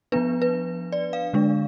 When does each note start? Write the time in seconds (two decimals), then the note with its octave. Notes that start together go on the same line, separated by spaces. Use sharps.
0.12 F3 B3 D4 B4
0.42 B4
0.92 D5
1.13 F5
1.33 D3 G#3 D4